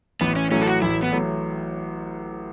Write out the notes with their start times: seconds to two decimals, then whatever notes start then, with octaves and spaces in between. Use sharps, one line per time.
0.21 A1 B3
0.36 C#4
0.51 A2 F#3 C#4
0.62 A4
0.67 F#4
0.82 A1 E4
1.03 B3
1.12 A2 F#3